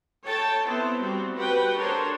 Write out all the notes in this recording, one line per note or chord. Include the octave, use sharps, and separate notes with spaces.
A4 C#5 G5 A5
B3 C4 E4 C5
G3 C4 F#4
F#4 G4 B4 F#5 G5
D4 A4 A#4 C5 C#5